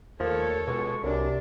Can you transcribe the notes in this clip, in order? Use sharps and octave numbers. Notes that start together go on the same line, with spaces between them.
D#2 F3 A3 A4 A#4 C#5
C#2 B2 G#3 C#6
C2 F#2 C3 D4